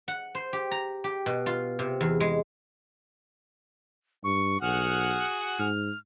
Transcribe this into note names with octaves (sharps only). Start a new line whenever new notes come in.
F#5
C5
G4
A#5
G4
B2
F4
C3
E2
G#3
G2 C#6
B1 F#4 G#4 F#5 F6
G#2 F6